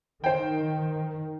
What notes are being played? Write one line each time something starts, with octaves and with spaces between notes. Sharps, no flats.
D#3 C5 G5